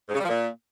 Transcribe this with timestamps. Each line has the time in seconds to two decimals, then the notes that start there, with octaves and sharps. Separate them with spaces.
0.09 G#2
0.14 C#3
0.19 G3
0.24 F3
0.29 A#2